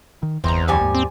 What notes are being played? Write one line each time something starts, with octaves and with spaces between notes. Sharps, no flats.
D#3
G1 E2 C4 D#5 A#5
D2 F3 G3 G#5
D#2 G#2
C4